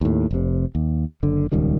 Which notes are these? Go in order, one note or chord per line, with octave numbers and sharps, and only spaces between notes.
D#2 A2
F1 C3
D#2
F#1 D3
D#1 C#2 D#3 G3